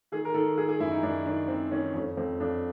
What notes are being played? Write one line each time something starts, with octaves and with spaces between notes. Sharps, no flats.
D#3 G#4
A#4
D#3 A4
D#3 G#4
G#4
F#2 E4
D#4
F#2 D4
D#3 D4
D#3 C4
D#3 C#4
F2 C#4
F2 C4
F2 D4